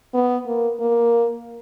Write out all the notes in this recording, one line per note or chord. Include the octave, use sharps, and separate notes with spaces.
B3
A#3
A#3